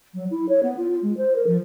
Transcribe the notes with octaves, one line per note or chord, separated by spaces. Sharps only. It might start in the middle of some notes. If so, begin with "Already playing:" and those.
F#3
E4
C#5
B3
F4
F4
G#3
C5
A#4
F3